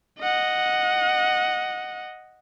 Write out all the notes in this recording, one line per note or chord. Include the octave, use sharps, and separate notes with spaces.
D#5 F#5